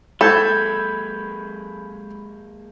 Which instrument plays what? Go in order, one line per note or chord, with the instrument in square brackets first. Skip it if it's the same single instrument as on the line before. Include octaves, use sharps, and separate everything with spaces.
[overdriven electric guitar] G#3 A#3 [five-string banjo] A4 [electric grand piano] B5 G6 G#6